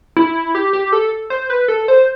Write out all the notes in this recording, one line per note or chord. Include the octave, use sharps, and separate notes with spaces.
E4
G4
G4
A4
C5
B4
A4
C5